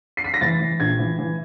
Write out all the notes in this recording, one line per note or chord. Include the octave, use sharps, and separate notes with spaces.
C7
B6
A#6
E3 A6
E3
A#1 G#6
E3
E3